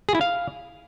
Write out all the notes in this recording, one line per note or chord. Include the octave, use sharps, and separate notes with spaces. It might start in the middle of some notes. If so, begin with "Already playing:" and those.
G#4
E4
F5